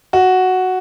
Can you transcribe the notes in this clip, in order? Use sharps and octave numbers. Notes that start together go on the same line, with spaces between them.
F#4